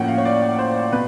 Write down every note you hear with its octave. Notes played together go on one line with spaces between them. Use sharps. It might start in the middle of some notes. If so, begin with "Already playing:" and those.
Already playing: A2 F3 A#3 C#4 F#5 G5
F5
C#5
D5
C5
B2 B4